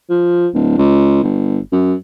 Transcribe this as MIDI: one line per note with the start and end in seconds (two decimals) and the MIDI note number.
0.10 0.47 53
0.54 0.74 26
0.78 1.22 37
1.23 1.59 31
1.72 1.95 42